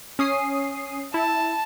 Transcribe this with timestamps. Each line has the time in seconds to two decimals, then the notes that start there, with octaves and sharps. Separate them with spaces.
0.19 C#4 D#6 C7
1.14 E4 A5